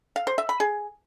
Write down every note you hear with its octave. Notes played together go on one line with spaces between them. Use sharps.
F5
C5
E5
B5
G#4